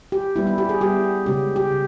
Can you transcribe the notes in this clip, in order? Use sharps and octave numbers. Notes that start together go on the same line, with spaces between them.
G4
G3 B3 E4
E4
G4
G#4
G3 B3 E4 G4
C#3 G#3 C#4 G4
G4
C#3